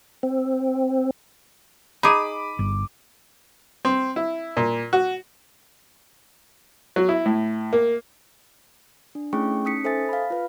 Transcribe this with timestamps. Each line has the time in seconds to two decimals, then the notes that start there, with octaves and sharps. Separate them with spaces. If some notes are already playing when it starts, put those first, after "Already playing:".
0.23 C4
2.03 D#4 G#4 B5 D6 D#7
2.59 G1
3.85 C4
4.16 E4
4.57 A#2
4.93 F#4
6.96 F#3
7.09 E4
7.26 A2
7.73 A#3
9.15 D4
9.33 A3 C#4 E4 G#4 G5 C#6
9.65 C#4 D#4 D#6 B6 C#7
9.84 A4 C5 E5 G#5 D#6 A6
10.09 F5 B5
10.30 F4 B4